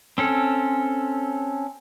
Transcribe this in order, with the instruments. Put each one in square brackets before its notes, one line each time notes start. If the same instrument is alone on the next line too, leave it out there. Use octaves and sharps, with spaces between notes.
[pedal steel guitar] C4 C#4 A4